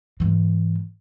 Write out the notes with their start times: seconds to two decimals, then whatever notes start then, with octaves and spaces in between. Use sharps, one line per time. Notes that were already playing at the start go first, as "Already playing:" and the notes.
0.20 G#2 E3